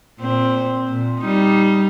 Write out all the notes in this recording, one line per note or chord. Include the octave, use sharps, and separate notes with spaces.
A#2 C4
A#2
G3 D#4